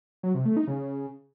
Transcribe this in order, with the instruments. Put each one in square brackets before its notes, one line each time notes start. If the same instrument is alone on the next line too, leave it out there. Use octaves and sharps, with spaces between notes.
[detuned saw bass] F#3
C3
A3
D#4
C#3